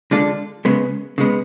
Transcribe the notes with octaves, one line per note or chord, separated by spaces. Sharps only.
D3 G#3 D4 F4 A4
C#3 G#3 B3
C#3 G#3 B3